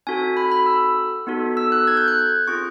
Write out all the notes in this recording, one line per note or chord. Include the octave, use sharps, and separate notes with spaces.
C4 D#4 F#4 A4 G#5
B5
B5
E6
B3 D#4 F#4 A4
E6
F#6
G#6
G6
F#6
C4 F4 G#4 C#6